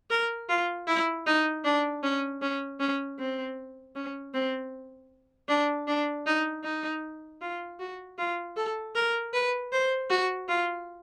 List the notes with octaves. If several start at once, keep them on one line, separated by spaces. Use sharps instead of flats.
A#4
F4
E4
D#4
D4
C#4
C#4
C#4
C4
C#4
C4
D4
D4
D#4
D#4
F4
F#4
F4
A4
A#4
B4
C5
F#4
F4